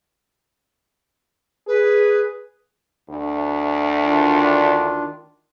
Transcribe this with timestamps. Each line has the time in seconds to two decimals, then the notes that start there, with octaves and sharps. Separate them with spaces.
1.67 G#4 B4
3.09 D2
4.05 D#3 D4 F4